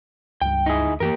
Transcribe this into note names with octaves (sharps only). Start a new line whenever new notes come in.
C#2 G2 G5
D#4 E4 G#4
D2
F#2 E3 A#3 G4 A#4